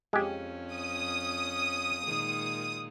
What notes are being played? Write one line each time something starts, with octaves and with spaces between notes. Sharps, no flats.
F2 G#3 C#4 G4
D#6
A#2 D#3 G#3